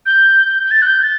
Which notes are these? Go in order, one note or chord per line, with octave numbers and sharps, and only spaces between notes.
G6
G6
A6
F#6
G6
A6